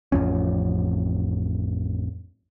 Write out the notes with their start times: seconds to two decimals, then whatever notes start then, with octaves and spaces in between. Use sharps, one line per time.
0.12 A1 F2 F3 C#4